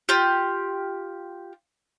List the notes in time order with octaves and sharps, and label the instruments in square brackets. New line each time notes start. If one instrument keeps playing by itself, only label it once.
[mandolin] F4 G4